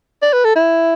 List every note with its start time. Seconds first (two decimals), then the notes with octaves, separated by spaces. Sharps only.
0.22 D5
0.33 B4
0.44 A4
0.56 E4